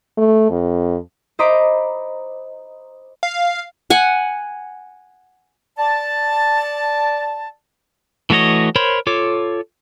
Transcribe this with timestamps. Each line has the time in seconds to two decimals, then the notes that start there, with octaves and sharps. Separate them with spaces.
0.17 A3
0.50 F2
1.39 C5 D#5 A#5 B5 D6
3.23 F5
3.90 F#5 G#5
5.78 D5 A5
8.30 E3 A3 F#4 C#5 D#5
8.76 A#4 C5 C#5 B5 C6
9.07 F4 A4 C#5 D6